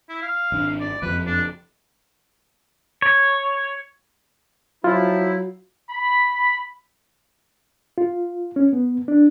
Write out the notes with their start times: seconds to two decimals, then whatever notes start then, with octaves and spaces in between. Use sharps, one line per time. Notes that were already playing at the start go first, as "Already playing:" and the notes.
0.09 E4
0.22 F5
0.52 G#1 D4
0.80 D5
1.02 F#1 F2 F3 B4
1.26 D4
3.02 C#5
4.84 F3 F#3 E4 F4
5.90 B5
7.98 F4
8.56 C#4
8.73 B3
9.08 D4